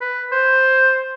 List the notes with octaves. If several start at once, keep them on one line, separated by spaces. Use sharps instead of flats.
B4
C5